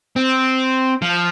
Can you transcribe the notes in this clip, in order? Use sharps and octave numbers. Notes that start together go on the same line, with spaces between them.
C4
F3